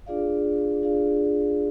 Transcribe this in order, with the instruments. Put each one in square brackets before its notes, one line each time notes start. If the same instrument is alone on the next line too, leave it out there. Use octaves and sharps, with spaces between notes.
[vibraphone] D4 F4 G#4 D5 F5
D4 F4 G#4 D5 F5